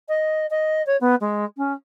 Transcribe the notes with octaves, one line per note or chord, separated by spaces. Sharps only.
D#5
D#5
C#5
B3
G#3
C#4